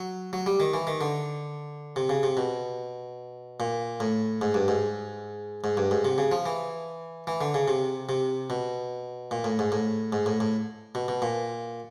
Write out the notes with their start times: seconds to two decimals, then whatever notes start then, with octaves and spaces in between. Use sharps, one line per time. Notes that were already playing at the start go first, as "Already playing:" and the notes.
Already playing: F#3
0.33 F#3
0.46 G3
0.60 D#3
0.74 E3
0.87 D#3
1.01 D3
1.96 C3
2.09 C#3
2.23 C3
2.37 B2
3.60 A#2
4.00 A2
4.42 G#2
4.54 G2
4.68 G#2
5.64 G#2
5.77 G2
5.91 G#2
6.05 C3
6.18 C#3
6.32 F3
6.46 E3
7.27 E3
7.41 D3
7.54 C#3
7.68 C3
8.09 C3
8.50 B2
9.31 A#2
9.44 A2
9.59 G#2
9.72 A2
10.13 G#2
10.26 A2
10.40 A2
10.95 B2
11.08 B2
11.22 A#2